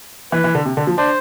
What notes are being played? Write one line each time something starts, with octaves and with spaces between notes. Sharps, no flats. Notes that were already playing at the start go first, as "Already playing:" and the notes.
E3 B4
E3
D3
C3
D3
F3
D4 C5